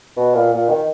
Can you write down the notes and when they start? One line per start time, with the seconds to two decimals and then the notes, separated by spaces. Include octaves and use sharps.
0.17 B2
0.34 A#2
0.53 A#2
0.69 D#3